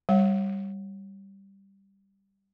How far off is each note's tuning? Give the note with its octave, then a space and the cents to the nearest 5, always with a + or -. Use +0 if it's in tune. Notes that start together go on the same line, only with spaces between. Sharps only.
G3 +0 C#5 -30 F#5 +0